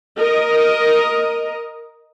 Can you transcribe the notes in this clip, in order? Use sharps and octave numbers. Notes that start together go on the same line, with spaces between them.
A#4 D#5